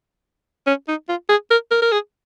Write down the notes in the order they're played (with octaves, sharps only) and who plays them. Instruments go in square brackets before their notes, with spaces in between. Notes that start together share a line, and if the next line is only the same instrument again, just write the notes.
[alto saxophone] C#4
D#4
F4
G#4
A#4
A#4
A#4
G#4